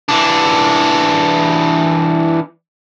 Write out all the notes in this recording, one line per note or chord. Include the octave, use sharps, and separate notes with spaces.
E3 D4